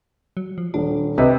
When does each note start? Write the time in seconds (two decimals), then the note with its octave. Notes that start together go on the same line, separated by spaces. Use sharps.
0.37 F#3
0.58 F3
0.74 D#1 D4
1.18 C2 C3 B4 D#5